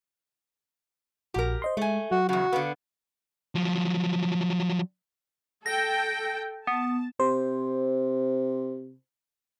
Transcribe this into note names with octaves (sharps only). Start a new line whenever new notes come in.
A#1 F#4 G4 A#4
C5 D#5 C6
G#3 A3 G#5
F#3 F#4
E2 C#3 F#4
D3 B3 F5
F3 F#3
A4 G5 A#6
B3 A5
C3 C5